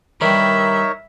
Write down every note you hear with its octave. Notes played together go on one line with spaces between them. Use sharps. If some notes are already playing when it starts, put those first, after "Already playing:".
G2 D#3 G3 D#4 A#4 C#5 E5